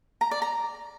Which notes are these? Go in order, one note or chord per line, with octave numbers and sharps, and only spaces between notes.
A#5
D5
A#5